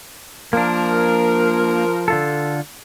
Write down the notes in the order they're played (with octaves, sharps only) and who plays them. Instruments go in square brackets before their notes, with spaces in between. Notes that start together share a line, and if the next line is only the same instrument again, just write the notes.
[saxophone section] F3 A#4 [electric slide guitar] A#3 D4
[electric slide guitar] D3 F4 A4